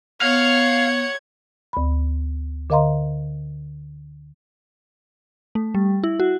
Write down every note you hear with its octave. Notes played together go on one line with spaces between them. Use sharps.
B3 C#5 F5 F#5 G#6
D2 B5
D3 A#4 D#5 F5 A#5 C6
A3
G3
E4
F#4